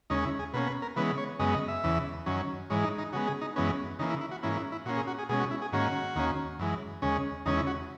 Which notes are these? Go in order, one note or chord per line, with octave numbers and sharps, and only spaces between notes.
D#2 C#3 G#3 C#4 D#4
E4
G#4
B2 A#3 C#4 B4
B4
A#4
C#3 E3 G#3 B3 B4
C#5
F#2 C#3 G#3 B3 D#5
D#5
E5
E2 C#3 E3
F#2 D#3 F#3 C#4
G#2 E3 G#3 C#5
D#4
D#4
C#3 G#3 B3 F#4
G#4
D#4
F#2 E3 G#3 B3 C#4
C#3 E3 A#3 D#4
E4
E4
F#4
G#2 E3 A#3 C#4 E4
E4
E4
A#2 A#3 C#4 F#4
G#4
F#4
G#4
B2 G#3 C#4 G#4
F#4
E4
G#4
G#2 D#3 A#3 C#4 F#4
D#2 D#3 A#3 C#4
F#2 E3 G#3
D#2 C#3 G#3 C#4
E2 C#3 G#3 C#4 D#4
E4
F#4